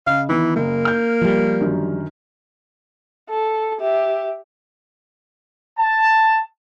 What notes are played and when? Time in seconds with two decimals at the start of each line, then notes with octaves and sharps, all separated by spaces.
0.07 C#3 D#5 F5
0.29 D#3 E3 B3 E4
0.56 F#1 A#3
0.85 F6 G6
1.22 F3 G3
1.61 F#2 D3 D#3
3.30 A4
3.81 G4 E5
5.79 A5